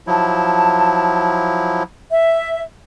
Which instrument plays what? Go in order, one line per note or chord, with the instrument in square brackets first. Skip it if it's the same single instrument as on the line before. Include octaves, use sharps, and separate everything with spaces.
[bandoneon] F3 F#3 E4 [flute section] A5
[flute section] E5